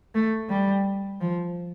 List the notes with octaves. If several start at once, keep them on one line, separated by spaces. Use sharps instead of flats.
A3
G3
F3